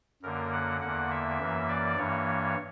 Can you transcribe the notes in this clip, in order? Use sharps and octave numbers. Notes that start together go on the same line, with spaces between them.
F#2 D3 A#3 A#4
F#5
E2 D3 A#3 F#5
E5
F#2 E3 A#3
D5
G2 E3 A#3 C#5